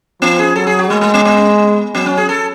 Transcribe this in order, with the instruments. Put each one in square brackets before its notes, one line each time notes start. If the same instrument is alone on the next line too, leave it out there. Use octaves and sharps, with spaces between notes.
[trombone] F3 [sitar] B3
[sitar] G#4
[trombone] F#3 [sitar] A4
[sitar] G#4
F#4
[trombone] G#3 [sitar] A3
[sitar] A3
B3
B3
[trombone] F#3 [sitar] B3
[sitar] C#4
G#4
A4